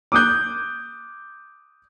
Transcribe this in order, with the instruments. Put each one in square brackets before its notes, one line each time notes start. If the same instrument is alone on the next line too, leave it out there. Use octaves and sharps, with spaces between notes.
[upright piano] D6 D#6 F#6 G6